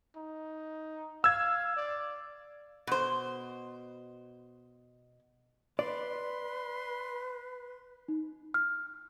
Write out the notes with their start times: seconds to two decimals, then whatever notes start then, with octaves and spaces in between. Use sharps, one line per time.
0.16 D#4
1.24 F5 E6 G#6
1.77 D5
2.87 B2 C5
5.79 B4 D5 C6
8.08 D#4
8.54 F6